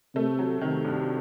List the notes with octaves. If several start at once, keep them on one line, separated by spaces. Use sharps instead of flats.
C3 A3
F#3
C3 D#3
G2